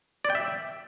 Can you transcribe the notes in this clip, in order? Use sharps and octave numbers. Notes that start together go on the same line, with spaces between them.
D5
G5
E5